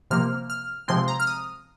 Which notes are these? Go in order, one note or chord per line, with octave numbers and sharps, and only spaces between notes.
C3 F3 A#3 F6
F6
C3 F3 G#3 C4 C6
A#5
F6
D#6